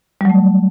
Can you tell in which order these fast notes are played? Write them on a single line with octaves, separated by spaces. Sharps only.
G3 F#3 A3